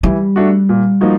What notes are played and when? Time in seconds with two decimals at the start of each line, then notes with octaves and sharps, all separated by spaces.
0.03 E3 G3
0.36 A3 D4 F#4
0.69 A#2
1.01 F3 A#3 D#4 F#4